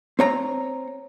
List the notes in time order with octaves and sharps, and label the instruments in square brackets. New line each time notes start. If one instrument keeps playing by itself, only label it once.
[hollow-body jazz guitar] C4 C#5 A#5